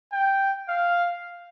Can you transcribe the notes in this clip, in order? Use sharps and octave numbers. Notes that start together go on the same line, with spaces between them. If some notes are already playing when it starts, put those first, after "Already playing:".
G5
F5